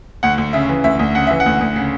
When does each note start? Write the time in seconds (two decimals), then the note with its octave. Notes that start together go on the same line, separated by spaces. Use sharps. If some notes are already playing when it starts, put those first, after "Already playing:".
0.23 D2 F#5
0.38 D2
0.53 C#3 E5
0.69 E3
0.84 D2 E5
0.99 D2
1.15 C#3 F#5
1.27 E3 E5
1.40 F#5
1.46 D2
1.60 D2
1.76 C#3